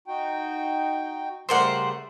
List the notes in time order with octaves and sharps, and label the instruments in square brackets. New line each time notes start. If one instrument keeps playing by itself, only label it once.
[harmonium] D#4 F#4 G5
[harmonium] C#3 G3 [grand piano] A3 A#4 C6 [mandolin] C5 D5 F#5